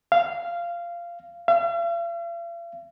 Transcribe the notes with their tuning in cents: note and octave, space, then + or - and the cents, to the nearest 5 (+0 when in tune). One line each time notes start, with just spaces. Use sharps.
F5 -15
F5 -45